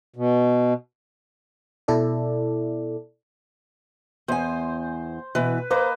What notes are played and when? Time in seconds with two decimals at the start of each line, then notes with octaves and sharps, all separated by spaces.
0.16 B2
1.88 B2 E4 A4 D5
4.28 E2 C5 G#5
5.35 B2 E3 B4
5.70 A#3 B4 C5 D#5